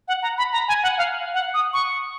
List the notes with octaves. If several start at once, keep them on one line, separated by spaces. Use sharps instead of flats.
F#5
A#5
B5
A#5
G#5
F#5
F5
F#5
D#6
C#6